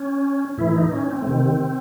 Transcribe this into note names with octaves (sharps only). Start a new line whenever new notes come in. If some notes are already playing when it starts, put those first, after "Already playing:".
Already playing: C#4
A2 E3 E4
D#4
C#4
C4
A3
C3 D#3 C4